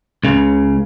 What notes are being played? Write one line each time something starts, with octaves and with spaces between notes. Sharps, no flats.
C#2 C#3